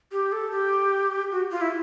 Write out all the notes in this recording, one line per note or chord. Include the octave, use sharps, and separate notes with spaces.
G4
A4
G4
F#4
F4
E4